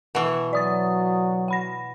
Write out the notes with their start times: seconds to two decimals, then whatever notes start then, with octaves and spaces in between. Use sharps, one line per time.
0.15 B2 E3
0.53 F#3 D5 D#6 A6
1.48 F#5 B5 A#6